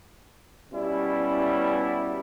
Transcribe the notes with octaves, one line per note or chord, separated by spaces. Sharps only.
B2 G3 C#4 E4